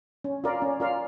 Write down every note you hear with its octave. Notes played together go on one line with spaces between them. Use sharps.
C#4
F4 A#4 D5 F5
C#4
F4 A#4 D5 F5